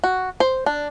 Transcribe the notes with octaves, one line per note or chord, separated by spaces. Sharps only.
F#4
C5
D4